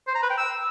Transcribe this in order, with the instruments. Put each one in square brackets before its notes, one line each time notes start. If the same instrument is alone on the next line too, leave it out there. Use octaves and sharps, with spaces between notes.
[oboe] C5
A#5
B4
G5
E6